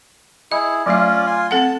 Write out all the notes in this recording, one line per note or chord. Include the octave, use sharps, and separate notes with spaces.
E4 G#4 D#5
F#3 A3 C#4 F4 D5 E5
F4 G#5 C6
C4 A4 F#5 A5